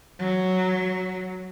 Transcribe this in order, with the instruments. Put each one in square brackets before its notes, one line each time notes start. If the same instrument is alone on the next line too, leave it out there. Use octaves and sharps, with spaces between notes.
[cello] F#3